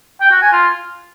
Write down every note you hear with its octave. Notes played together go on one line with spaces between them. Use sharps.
G5
F#4
G#5
F4